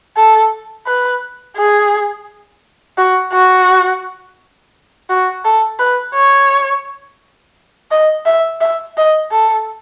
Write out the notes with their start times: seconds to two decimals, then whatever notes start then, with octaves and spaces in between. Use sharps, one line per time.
0.17 A4
0.87 B4
1.57 G#4
2.98 F#4
3.33 F#4
5.10 F#4
5.45 A4
5.79 B4
6.14 C#5
7.91 D#5
8.26 E5
8.61 E5
8.97 D#5
9.31 A4